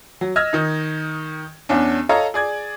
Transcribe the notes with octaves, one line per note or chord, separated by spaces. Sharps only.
F#3
D#5 E6 F6 G#6 A#6
D#3 D#4
E2 C#4 D4
A4 C#5 D#5 F5 A#5
G#4 D5 G#6